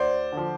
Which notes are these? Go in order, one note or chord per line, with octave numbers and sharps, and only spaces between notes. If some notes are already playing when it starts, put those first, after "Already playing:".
Already playing: D2 C5 D5
D3 F3